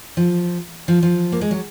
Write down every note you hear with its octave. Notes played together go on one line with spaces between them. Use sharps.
F3
F3
F3
A#3
G#3
F#3